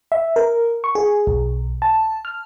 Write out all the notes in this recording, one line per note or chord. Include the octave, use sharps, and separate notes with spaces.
E5
A#4
C#6
G#4
B1
A5
F6